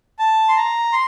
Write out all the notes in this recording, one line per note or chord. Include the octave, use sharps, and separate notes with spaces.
A5
C6
A#5
C6